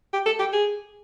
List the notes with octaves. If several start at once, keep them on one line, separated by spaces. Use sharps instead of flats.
G4
A4
G4
G#4